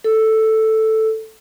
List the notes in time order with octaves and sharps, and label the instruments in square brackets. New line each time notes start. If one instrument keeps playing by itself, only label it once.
[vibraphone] A4